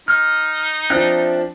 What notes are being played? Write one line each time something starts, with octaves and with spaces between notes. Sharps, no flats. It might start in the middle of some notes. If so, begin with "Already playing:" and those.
D#4 F6
F3 C4 D4 E5 G5 F#6